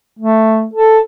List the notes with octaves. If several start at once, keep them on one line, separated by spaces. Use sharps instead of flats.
A3
A4